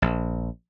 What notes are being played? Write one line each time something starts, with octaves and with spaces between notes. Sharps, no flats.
A#1